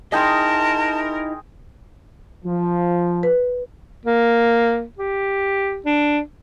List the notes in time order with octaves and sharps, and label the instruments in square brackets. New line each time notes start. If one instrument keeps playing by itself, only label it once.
[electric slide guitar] D#4 E4 D#5 [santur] G#4 G5 C6 [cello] A#4 [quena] A5
[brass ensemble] F3
[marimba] B4
[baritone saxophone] A#3
G4
D4